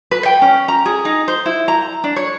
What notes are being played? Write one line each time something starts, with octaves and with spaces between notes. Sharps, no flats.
B4
G5
C#4
A#5
G#4
D#4
C5
E4
A#5
D4
C#5